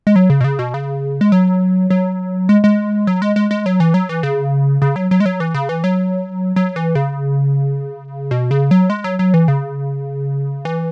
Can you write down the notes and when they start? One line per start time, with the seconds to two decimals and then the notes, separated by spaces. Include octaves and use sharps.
0.07 G#3
0.16 F#3
0.30 C#3
0.41 B2
0.44 C#3
0.59 B2
0.74 C#3
1.21 G#3
1.32 F#3
1.90 F#3
2.49 G#3
2.64 G#3
3.07 F#3
3.22 G#3
3.36 G#3
3.51 G#3
3.66 F#3
3.80 E3
3.94 F#3
4.09 E3
4.23 C#3
4.82 C#3
4.96 F#3
5.11 F#3
5.20 G#3
5.26 F#3
5.40 E3
5.54 C#3
5.69 E3
5.84 F#3
6.56 F#3
6.76 E3
6.95 C#3
8.31 B2
8.51 C#3
8.71 F#3
8.90 G#3
9.04 F#3
9.19 F#3
9.34 E3
9.48 C#3
10.65 E3